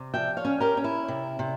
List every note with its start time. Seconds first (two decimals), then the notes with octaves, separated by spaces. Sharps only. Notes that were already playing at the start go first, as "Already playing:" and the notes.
Already playing: C3
0.14 F3 E5 G5
0.37 C#5 F5
0.45 C#4
0.60 G4 A#4
0.77 C#4
0.84 E4
1.08 C3
1.39 C3